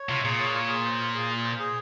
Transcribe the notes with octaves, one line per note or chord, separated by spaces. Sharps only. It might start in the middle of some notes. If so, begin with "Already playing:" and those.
Already playing: C#5
C3 F4
A#2 G#4
C#5
F4
G#4
C5
F4
G#4
F4
C5
G#4